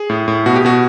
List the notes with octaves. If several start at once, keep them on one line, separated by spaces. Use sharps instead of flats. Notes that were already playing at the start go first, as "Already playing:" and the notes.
Already playing: G#4
A2
A2
B2 F#4
G4
B2 F#4